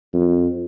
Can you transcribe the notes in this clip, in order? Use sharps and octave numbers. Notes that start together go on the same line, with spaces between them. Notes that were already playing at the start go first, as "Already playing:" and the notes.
F2